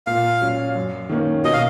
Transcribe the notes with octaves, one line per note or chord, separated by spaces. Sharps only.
A#2 F5
F#3 C#4
F#2
D#3 A#3 C#4
B2 D#5
F5